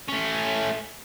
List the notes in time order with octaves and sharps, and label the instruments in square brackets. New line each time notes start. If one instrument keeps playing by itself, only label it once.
[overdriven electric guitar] A3 C#4